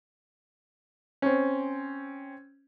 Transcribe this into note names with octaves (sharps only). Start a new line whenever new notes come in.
C4 C#4